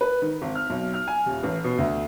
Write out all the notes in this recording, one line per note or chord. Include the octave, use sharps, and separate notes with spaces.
B4
D#3
G#1
F6
B1
F6
G#5
D#1
A1
B2
D2